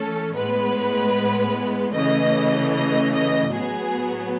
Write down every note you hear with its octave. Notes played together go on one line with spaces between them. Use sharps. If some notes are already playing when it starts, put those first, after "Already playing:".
Already playing: E3 A3 C#4 A4
A2 G#3 B3 B4
C#3 E3 A3 D#5
D#5
D#5
A2 F#3 B3 G#4